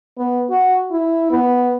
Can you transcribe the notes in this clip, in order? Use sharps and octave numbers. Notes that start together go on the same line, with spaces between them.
B3
F#4
E4
B3